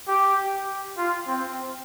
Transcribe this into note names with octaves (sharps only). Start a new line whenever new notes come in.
G4
F4
C4